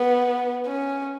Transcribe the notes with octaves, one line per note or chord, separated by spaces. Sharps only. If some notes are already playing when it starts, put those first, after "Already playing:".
Already playing: B3
C#4